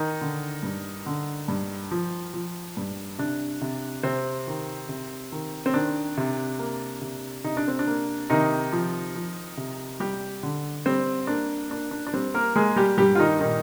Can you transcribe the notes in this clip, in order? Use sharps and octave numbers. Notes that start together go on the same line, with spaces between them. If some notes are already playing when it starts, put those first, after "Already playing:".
Already playing: D#3 D#4
D3
G2
D3
G2
F3
F3
G2
C3 D4
C3
C3 C4
D#3
C3
D#3
C4
D#3 D4
C3
A#3
C3
C3 D#4
D4
C4
D4
A#3
C3 D#3 D#4
F3
F3
C3
G3 G4
D3
G3 C4
A#3 D4
A#3 D4
D4
D4
G3 C4
A#3 A#4
G#3 A#3 G#4
G3 G4
G2 G3 G4
F4
D#3 D#4
A#2 D#3 D#4